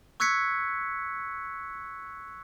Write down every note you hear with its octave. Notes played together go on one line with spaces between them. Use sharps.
C#6 E6 F#6 G#6 B6 C#7